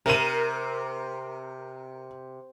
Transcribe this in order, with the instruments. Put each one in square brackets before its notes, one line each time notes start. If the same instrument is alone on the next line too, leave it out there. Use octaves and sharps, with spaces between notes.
[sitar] C3 [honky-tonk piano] A#4 D#7